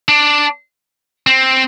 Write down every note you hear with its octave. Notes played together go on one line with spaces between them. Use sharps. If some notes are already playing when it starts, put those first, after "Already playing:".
D4
C4